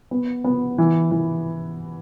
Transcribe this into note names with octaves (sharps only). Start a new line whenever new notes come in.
B3
B3
E3
E3